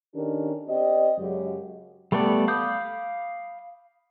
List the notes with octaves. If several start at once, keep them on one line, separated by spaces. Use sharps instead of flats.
D#3 C#4 D4 G4 A4 A#4
C4 G4 D5 D#5
F#2 C#3 F#3 G#3 F#4 G4
G3 A3 B3 A4 D5
F5 B5 D6 D#6 G6